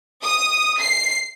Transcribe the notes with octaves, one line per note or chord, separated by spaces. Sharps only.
D#6
C7